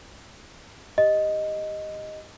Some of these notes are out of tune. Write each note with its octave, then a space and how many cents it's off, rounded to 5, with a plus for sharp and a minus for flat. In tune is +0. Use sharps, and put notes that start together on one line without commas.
G4 +10 D#5 +0